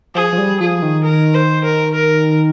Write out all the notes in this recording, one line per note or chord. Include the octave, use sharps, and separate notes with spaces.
F3 G#4
F3
G3
F3 G#4
D#3
A#4
C5
A#4
A#4